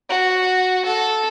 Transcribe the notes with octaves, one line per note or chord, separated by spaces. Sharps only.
F#4
A4